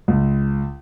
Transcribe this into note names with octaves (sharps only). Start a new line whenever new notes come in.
C#2